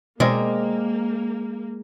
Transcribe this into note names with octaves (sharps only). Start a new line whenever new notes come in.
B2 G#3 A#3 C4 A#4 D5